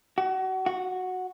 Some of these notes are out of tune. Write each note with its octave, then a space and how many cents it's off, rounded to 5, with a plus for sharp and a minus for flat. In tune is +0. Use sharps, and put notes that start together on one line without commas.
F#4 +30
F#4 -5